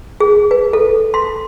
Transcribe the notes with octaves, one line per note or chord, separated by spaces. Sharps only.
G#4
B4
A4
C6